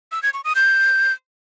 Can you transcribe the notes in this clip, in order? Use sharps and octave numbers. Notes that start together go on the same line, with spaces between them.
E6
G#6
C#6
D#6
G6